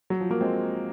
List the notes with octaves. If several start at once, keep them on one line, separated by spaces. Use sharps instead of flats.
F#3
F3
F#3 A#3
G#3 C4